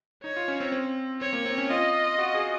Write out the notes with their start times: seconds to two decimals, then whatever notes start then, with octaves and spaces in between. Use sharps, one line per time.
0.24 D#4 C#5
0.37 F4
0.48 C#4
0.60 C4
0.72 C4
1.21 C4 C#5
1.33 A#3
1.45 C4
1.58 C#4
1.70 F4 D#5
2.19 F#4
2.35 G#4